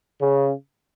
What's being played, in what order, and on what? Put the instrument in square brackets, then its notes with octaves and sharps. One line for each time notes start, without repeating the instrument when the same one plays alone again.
[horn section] C#3